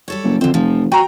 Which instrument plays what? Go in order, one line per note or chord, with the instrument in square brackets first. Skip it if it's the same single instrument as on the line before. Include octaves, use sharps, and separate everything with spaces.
[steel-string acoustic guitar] G3 A4 C#5
[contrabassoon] F#1
[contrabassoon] F2 [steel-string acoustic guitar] D3 C4
[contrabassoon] F1 [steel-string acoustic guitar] F3
[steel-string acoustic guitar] F#4 G#5 [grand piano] G5 A#5